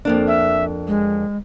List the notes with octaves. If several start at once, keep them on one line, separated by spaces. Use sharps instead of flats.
F2 A#3 D4
E5
G#3